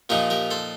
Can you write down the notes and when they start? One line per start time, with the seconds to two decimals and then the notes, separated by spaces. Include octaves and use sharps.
0.09 A#2 F3 A#3 D#4 G4 A#4
0.30 G4 A#4
0.51 A4 C5